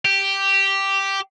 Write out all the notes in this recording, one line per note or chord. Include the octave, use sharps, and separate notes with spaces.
G4